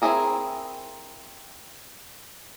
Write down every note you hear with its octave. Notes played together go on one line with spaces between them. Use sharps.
C4 D4 E4 G#4 A#4